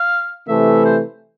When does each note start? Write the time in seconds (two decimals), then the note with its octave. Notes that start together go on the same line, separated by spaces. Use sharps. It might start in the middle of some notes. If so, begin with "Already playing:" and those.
Already playing: F5
0.47 C3 E3 A3 E5
0.85 C5